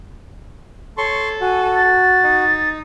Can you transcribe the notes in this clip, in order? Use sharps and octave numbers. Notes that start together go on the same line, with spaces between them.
A4 C#5 C6 C#6
F#4 G#5
A6
D#4